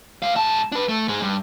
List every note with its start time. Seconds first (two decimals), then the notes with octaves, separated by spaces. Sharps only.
0.22 G#3 F5
0.36 G#2 A5
0.72 D4 B4
0.89 A3
1.08 G#2 G#3
1.21 G2